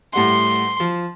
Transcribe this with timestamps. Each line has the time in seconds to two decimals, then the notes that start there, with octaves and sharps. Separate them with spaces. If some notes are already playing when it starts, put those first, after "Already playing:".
0.13 A2 G3 F#5 C6
0.80 F3